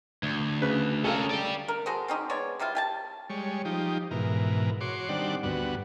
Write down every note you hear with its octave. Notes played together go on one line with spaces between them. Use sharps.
D2
C#3 B4
C#4 A4 A#4 D#5 F5
D5 G5
A#4
F#4 G#4 A4 C5
C4 C#4 D#4 G4
G#3 B3 C#5 D5
C3 G3 E4 F4
G4 G#5 A5
G3 G#3 C#5
F3 D#4 G4
G#2 B2 E3 A#4
F#4 C#5 C6 D6
D#3 G3 C4 D4 D5 F#5
D2 G2 B3 F#4